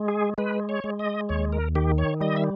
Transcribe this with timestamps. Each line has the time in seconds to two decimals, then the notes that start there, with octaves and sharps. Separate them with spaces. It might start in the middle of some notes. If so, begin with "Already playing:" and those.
Already playing: G#3
0.08 G#4
0.38 G#3 B4
0.69 C#5
0.84 G#3
0.99 D#5
1.29 D#2 C#5
1.53 A#4
1.75 D#3 G4
1.98 C#5
2.21 G3 D#5
2.36 E5